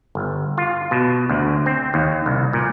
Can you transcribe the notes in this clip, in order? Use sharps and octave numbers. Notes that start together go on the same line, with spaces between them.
G1
F4
B2
D2
C4
D#2
C2
A#2